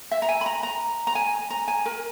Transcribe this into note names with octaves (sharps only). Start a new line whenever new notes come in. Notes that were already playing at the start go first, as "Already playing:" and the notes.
E5
A#5
G#5
B5
A#5
A#5
A#5
G#5
A#5
G#5
A#4